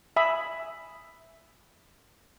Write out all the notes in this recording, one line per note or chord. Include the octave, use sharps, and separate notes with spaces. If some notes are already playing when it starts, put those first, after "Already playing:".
E5 G#5 B5 D#6